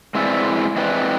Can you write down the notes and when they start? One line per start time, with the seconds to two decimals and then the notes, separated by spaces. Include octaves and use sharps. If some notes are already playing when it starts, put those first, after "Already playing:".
0.15 G#3 C4 E4 B4 D5
0.76 G#3 C4 E4 B4 D5